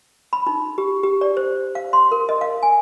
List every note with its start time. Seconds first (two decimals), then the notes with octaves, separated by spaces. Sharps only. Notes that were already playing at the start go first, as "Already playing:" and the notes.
0.33 B5
0.47 D#4
0.78 G4
1.03 G4
1.21 D5
1.37 C5
1.75 F5
1.93 C6
2.12 A#4
2.29 D#5
2.41 F5
2.63 G#5